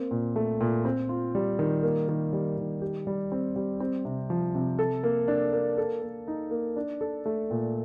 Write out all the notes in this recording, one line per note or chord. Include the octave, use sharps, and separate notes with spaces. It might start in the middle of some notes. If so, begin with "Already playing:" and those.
Already playing: A#3 C4
A#2
A3
A#2
C4
F4
G3
D#3
A#3
D#3
G3
D#3
G4
G3
C4
G3
C4
C3
F3
C3
A4
A#3
D4
A#3
A4
A#3
D#4
A#3
D4
A4
A3
A#2